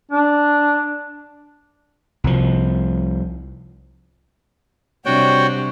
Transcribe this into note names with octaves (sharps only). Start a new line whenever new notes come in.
D4
C2 F3
C3 G3 D4 F#4 C#5 G5